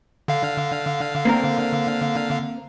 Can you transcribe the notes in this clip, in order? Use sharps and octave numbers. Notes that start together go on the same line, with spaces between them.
D3 F5
A#3 C4 A#4